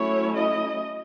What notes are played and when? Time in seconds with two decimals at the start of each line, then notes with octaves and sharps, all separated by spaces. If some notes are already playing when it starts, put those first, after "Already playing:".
Already playing: F#3 A3 C#4 E4 C#5
0.37 D#5